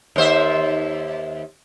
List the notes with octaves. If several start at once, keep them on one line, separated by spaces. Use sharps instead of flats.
D#2 C5 E5